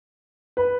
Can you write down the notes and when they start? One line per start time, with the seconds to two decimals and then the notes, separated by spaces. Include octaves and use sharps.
0.57 B4